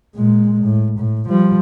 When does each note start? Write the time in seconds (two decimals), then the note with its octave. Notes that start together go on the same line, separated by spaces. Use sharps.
0.15 A#2 G#3
0.64 A2
0.99 A2
1.29 F3 G3